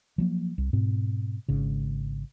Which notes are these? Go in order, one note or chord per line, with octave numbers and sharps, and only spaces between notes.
F3 F#3 A#3
C2
G#2 B2 C4
G#1 G#2 C#3